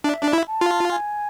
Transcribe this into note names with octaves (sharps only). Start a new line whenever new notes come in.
D4 E5
D4
E4
A5
F4
G#5